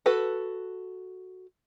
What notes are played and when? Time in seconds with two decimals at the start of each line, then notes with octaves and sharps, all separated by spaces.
0.06 F#4 A4 B4